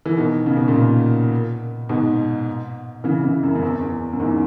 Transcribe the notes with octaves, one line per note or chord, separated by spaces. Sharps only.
E3
B2 D#3
C#3
B2
A#2 C#3
G#2 B2
C#3 E3
C#3 E3
F#2
F#2
E2
E2
F#2
E2 G#2